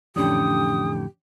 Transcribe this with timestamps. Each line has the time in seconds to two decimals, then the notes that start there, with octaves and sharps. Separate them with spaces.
0.16 F2 A2 D3 E3 C#4 D4 G4 D#6